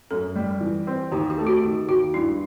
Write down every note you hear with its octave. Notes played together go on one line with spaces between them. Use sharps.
F#2 A4
G3
E3
C4
D#2 G4
G4
A3
F#4
D#3 G4
D#2 F#4
G2 E4